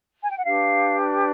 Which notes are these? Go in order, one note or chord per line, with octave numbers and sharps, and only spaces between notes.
G#5
G5
F#5
D4 G4 B4 F5